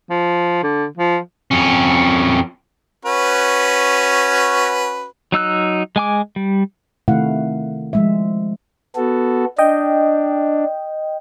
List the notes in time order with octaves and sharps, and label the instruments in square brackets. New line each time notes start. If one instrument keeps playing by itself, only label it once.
[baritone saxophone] F3
D3
F3
[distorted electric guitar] F2 C#4
[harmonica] C#4 F#4 B4
[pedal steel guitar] F#3 D#4 E6 F#6
G#3 G#5 D6
G3
[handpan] C3 D#3 A3 E4 F5 F#5
F3 G#3 E5
[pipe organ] B3 F#4 A4
[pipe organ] D4 [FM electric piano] D#5 G5